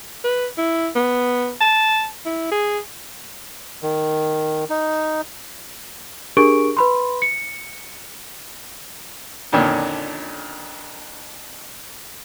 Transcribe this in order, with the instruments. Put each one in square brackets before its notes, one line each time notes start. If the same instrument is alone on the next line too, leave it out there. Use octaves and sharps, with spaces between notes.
[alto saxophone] B4
E4
B3
A5
E4
G#4
[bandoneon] D#3
D#4
[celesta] D4 G4 G#4 A#4 C#6 D7
B4 B5 C6
C#7
[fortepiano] F2 A#2 D3 D#3 C#4